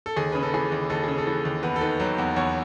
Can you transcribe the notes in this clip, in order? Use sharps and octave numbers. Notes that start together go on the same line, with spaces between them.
A4
D#2 G#4
C#3 B4
A4
E3 G#4
D#2
D#2 A4
C#3 G#4
A4
E3
D#2
E2 B4
A4
D#3 B4
F#3
E2
E2 C#5